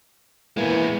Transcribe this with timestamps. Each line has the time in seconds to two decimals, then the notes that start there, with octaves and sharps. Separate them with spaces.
0.57 A#2 E3 G#3 A#3 B3